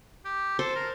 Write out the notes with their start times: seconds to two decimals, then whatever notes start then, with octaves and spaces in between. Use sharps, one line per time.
0.25 G4
0.59 A4 C5
0.76 A#4